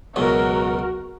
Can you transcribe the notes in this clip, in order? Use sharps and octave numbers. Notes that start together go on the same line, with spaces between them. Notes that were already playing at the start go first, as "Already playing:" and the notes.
C#2 F#2 B2 F#4 A#4